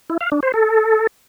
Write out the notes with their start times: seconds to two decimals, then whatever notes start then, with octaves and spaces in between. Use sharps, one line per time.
0.10 E4
0.21 F5
0.32 D4
0.43 C5
0.54 A4